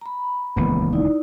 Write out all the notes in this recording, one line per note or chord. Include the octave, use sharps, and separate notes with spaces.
A#5 B5
D#1 C#2 E3 A#3 B3
D#4 E4 D5